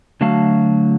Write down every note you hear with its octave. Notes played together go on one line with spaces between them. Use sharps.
D3 F#3 A3 F#4 F5 A5